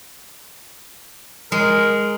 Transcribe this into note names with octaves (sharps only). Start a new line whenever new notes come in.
G#3 A#4